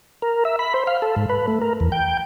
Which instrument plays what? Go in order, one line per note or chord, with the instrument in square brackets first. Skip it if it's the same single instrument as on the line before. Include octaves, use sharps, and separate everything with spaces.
[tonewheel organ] A#4
E5
B5
C5
F5
A4
G#2
B4
A3
A#4
E2
G5